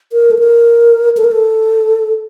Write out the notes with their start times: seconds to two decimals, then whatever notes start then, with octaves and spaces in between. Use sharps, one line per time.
0.13 A#4
0.31 A4
0.39 A#4
1.17 A4
1.24 A#4
1.31 A4